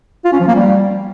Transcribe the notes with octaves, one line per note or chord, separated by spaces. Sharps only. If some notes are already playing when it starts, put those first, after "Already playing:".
F4
C#4
F3
A#3
G3